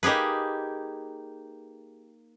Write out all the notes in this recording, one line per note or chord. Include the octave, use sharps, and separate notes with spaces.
A#3 D#4 G4 G#4 B4